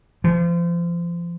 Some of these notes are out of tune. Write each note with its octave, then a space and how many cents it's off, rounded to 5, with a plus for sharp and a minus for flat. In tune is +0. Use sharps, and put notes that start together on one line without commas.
F3 -30